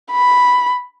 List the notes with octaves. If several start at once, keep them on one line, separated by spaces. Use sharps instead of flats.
B5